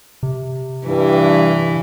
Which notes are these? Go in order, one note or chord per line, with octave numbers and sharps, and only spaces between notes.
C3
G2 E3